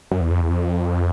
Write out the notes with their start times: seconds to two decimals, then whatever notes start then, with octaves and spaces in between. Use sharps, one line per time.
0.11 F#2
0.21 E2
0.31 F2
0.41 E2
0.50 F2